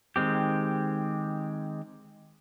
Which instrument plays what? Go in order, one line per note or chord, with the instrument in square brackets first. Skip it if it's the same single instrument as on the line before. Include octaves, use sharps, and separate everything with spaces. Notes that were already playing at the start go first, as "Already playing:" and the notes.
[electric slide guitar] D#3 G#3 C4 G4